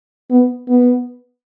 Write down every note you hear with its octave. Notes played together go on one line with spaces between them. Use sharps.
B3
B3